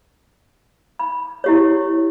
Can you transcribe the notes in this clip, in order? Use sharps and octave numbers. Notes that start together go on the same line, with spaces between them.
B5
E4 G4 C#5